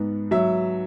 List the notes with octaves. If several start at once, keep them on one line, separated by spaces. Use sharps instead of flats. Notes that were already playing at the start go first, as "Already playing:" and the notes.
Already playing: G#2 B3
F#3 E5